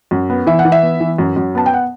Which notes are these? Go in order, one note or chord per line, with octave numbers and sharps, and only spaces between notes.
F#2
B3
E3 E5
F#5
E3
E5
B3
E3
F#2
F#2
B3 A5
G5
F#5